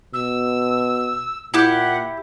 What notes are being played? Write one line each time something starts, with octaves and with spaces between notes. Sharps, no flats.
B2 E6
A#2 E4 G4 F#5